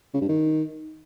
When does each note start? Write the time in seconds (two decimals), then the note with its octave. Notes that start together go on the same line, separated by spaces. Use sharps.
0.14 C#3
0.21 G2
0.29 D#3